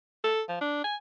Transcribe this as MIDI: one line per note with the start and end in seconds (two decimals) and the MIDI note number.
0.24 0.42 69
0.49 0.58 53
0.61 0.81 62
0.84 0.96 80